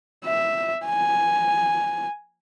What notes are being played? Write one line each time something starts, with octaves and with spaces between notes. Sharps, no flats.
E5
G#5